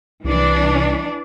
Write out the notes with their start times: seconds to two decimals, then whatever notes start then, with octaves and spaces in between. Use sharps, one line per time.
0.24 C2 E3 D4